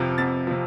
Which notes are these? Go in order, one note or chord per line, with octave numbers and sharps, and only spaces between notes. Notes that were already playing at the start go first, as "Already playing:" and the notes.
Already playing: F2 C3 F3 F6
F2 A6
C3 F3